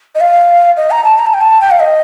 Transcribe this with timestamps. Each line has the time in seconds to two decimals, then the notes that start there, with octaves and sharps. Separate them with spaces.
0.15 D#5
0.20 F5
0.77 D#5
0.91 A#5
1.04 A5
1.19 A#5
1.26 A5
1.34 G5
1.41 A5
1.61 G5
1.71 F5
1.80 D#5